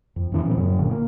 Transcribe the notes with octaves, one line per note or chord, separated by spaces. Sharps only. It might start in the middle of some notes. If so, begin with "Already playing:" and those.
F2
F2 C#3 E3 C#4
A#2 D3 G3 C4
F#2 C#3 F#3
F#1 A#2 D3 D#3
A#3